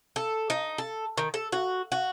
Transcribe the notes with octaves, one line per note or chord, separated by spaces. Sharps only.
A4
D#4
A4
D#3
A4
F#4
F#4